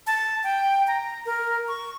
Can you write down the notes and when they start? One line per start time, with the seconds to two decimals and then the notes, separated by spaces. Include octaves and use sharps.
0.07 A5
0.44 G5
0.88 A#5
1.26 A#4
1.68 C#6